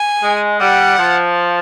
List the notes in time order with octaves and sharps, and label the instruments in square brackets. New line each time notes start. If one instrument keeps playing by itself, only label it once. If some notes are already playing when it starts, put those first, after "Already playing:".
Already playing: [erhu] G#5
[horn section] G#3
[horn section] G3 [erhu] F#5
[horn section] F3